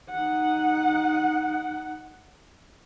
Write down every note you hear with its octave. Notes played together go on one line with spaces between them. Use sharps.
D#4 F#5